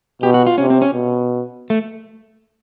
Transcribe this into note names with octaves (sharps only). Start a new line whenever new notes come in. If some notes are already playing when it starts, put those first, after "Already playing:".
B2 G4
F#4
F4
C3 C#4
C4
C#4
B2
A3